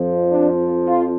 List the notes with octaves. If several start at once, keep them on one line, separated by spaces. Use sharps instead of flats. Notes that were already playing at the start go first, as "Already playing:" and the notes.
Already playing: F2 F3
D4
F4